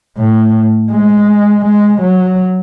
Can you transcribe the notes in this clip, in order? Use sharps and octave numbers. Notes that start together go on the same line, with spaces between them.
A2
G#3
G#3
F#3